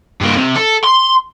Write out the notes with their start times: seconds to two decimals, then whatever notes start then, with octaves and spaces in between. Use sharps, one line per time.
0.21 G2 A#3
0.37 C3
0.56 A4
0.84 C6